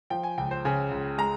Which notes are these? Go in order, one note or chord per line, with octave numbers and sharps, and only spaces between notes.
F3 G5
G#5
C#2 G5
C5
C#3 G#5
C#2
G#3 A#5